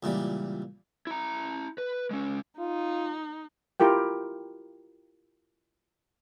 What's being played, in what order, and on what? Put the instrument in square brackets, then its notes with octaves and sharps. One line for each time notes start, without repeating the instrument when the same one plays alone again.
[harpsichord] C#2 A#2 E3 G3
[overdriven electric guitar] E4 A#5
B4
G#3 C#4
[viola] D#4 [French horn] F4
[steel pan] E4 F4 G4 A#4 G5